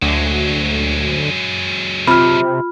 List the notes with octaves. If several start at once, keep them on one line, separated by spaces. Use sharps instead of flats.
D2 F#3 G#3
C3 F4 B5 F6